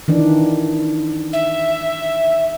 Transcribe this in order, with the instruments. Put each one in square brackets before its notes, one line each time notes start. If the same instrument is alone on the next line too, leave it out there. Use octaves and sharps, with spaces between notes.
[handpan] D#3 E3 D4
[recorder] E5